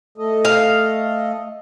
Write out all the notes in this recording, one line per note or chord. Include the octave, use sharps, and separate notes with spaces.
A3 A4 D#5
F5